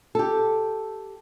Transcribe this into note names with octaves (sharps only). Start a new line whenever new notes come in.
G4 A4